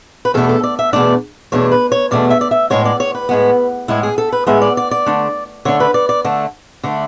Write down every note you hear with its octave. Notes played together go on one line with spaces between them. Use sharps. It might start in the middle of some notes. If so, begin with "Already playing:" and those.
B4
E2 B2 A3 D4 A4
A4
D5
E5
E2 B2 A3 D4 D5
E2 B2 A3 D4 C#5
B4
C#5
E2 B2 A3 D4 D5
E5
D5
E5
A2 G#3 B3 C#5
D5
C#5
B4
A2 G#3 B3
A2 G#3 B3 E4
G#4
A4
B4
A2 G#3 B3 E5
D5
D5
D5
D3 A3 D4
D3 A3 D4 C#5
B4
D5
D5
D3 A3 D4
D3 A3 D4